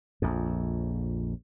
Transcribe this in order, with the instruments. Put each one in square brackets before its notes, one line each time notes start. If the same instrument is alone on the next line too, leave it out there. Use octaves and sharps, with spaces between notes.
[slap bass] A#1 F2